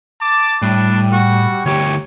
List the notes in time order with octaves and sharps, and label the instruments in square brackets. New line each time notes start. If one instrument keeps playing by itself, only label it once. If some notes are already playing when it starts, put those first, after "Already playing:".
[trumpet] A5 [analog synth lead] D6
[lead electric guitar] A2 [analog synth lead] G3 [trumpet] D4
[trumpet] F#4
[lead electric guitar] D2 G4 [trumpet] C#5